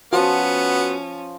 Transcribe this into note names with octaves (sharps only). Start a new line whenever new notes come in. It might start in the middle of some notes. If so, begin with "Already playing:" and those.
F3 B3 C#4 F#4